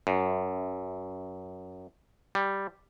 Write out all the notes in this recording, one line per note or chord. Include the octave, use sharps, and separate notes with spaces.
F#2
G3